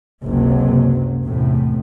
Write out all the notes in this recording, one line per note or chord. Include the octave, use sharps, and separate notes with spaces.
F#1 C#2 C3 F#3
E2 A2 C3